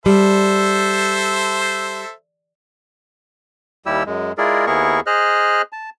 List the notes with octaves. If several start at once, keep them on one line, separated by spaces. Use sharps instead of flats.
G3 A4 C5 E5
D#2 G3 E4 G4 E6
F#2 G#3
G#3 E4 F4 G#4 A#4 D5
D#2 B3 E4 G#4 A#4 C#6
G#4 C5 D#5 F6 F#6
A5